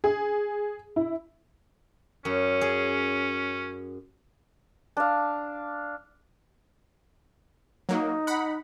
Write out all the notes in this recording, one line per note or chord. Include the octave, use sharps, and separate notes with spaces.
G#4
E4
F#2 C#4
G#4
D4 F5
F#3 A#3 D#4
F#5 B5